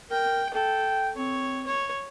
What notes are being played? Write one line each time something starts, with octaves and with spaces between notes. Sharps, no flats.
A#4 G5
A4 G5
C4 C#5
C#5